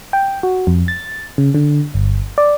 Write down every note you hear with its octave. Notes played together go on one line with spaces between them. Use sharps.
G5
F#4
F2
A6
C#3
D3
G1
D5